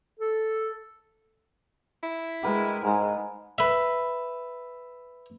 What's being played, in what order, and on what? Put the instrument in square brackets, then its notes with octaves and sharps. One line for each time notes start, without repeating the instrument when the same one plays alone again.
[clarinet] A4
[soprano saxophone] E4
[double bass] G#3 [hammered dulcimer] G4 A#4 B4
[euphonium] G#2 [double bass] G#3
[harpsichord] B4 E5